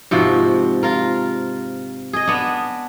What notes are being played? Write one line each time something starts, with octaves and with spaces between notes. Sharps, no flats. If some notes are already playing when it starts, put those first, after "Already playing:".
G#2 C3 F3 F#4
F4 A#4
G#4 D#5
B3 D4